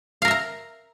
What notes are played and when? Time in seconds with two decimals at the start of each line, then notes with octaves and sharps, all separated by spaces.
0.22 F5
0.25 A#4
0.28 E5
0.31 A#5